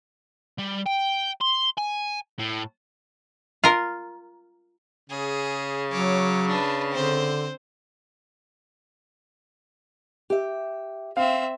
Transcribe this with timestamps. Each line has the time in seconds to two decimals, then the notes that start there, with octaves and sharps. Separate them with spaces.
0.58 G3
0.86 G5
1.41 C6
1.78 G#5
2.39 A2
3.64 F4 A#4
5.09 C#3 G#4
5.91 F#3 C#5 D6
6.48 D4 B4
6.92 D3 C4 C5
10.30 G4 E5
11.17 C4 E5 F5